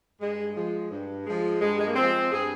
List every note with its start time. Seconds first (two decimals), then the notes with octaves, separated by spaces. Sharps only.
0.20 G2 G#3
0.55 F3 G#3
0.91 G2
1.26 F3 G#3
1.60 G2 G#3
1.79 G#3
1.87 A#3
1.95 F3 G#3 C4
2.31 G2 G#4